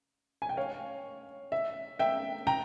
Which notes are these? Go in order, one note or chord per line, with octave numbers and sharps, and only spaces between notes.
G#5
G5
C#5 F5
E5
E5 G5
G5 A#5